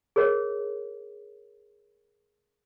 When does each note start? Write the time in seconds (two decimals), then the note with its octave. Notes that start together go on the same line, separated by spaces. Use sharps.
0.16 G#4 A#4 C#5 D#5